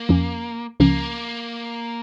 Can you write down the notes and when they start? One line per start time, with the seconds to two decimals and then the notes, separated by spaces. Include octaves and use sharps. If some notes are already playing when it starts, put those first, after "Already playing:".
Already playing: A#3
0.09 F2 F3 C#4
0.80 C#2 C#3 F3 A#3 C#4